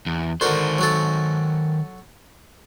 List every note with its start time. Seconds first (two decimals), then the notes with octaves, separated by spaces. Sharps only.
0.06 E2
0.41 D3 D#3 F#4 A#4 C5
0.78 F#3 F#4 A4